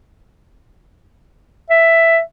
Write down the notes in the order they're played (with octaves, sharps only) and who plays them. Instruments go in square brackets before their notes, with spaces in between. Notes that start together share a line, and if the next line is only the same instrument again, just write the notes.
[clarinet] E5